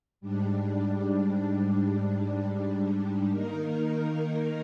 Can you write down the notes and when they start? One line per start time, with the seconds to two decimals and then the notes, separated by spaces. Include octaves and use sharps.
0.21 G#2 G3 D4
3.30 D#3 A#3 D#4 A#4